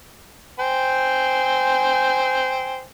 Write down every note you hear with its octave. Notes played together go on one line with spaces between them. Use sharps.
C5 G5 G#5